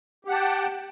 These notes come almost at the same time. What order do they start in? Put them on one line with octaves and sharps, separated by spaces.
G4 F#5 A5 G5